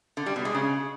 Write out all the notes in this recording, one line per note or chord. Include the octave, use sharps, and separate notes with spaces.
D3
G3
B2
G#3
C#3